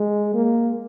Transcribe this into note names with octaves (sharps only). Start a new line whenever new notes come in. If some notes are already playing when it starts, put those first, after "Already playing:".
Already playing: G#3
A#3